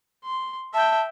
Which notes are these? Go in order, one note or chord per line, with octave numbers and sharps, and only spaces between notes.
C6
E5 G5 A5